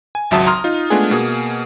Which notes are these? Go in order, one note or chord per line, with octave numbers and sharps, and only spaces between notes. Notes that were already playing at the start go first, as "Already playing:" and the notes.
G#5
G#1 C#2 F#3 E5 A5 D#6
A#5 C6 D#6 F6
D#4 F4
G#3 A3 B3 D4 F4 G#4
B2 A#3 G#4